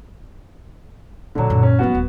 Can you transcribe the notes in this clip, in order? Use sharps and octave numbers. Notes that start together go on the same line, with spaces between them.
A#2 D3 F#3 D4
F#2 A#2
C#4
D#3 F#3 B3 F#4
D1